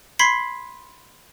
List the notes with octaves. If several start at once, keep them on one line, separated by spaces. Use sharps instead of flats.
B5 C6 G#6 B6 C7